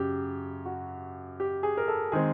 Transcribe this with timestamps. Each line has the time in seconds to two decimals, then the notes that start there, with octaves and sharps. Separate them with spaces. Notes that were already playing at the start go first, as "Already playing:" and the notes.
Already playing: F#2 C#3 G4
0.66 F#4
1.40 G4
1.63 G#4
1.77 A#4
1.88 A4
2.12 D#3 G#3 C4 G#4